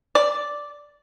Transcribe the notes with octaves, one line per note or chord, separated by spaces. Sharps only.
D5